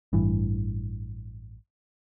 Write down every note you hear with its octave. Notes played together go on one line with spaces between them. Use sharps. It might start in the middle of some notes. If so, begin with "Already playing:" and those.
A1 G2 E3